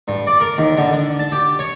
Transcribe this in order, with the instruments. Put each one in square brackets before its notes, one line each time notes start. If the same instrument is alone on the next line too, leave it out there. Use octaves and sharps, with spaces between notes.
[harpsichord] G2
D5
A#4
D#2
D3
D4
A5
G4
C#5